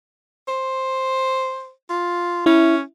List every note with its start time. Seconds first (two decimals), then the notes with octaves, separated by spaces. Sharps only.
0.48 C5
1.90 F4
2.46 C#4 E4